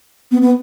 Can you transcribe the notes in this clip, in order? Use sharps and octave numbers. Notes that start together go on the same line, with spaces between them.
B3
B3